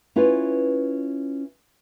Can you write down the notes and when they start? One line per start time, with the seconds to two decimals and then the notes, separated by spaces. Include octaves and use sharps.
0.16 C#4 E4 F4 B4